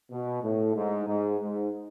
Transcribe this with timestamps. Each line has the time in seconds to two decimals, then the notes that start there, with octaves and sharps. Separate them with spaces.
0.11 B2
0.43 A2
0.75 G#2
1.07 G#2
1.40 G#2